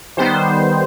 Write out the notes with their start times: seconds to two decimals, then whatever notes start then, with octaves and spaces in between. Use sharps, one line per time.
0.17 D#3 G3 B3 C5